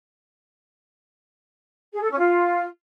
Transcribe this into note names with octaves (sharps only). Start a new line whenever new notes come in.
G#4
A4
C#4
F4